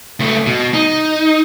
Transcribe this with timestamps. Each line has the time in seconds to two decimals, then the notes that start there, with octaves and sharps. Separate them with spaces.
0.20 C#2 A3
0.47 B2
0.74 D#4